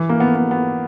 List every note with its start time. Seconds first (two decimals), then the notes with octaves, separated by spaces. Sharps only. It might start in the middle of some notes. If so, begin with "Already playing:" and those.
Already playing: E3
0.09 A#3
0.20 B3
0.35 B3
0.51 B3